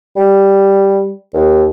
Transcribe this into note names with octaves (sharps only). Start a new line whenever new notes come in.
G3
D#2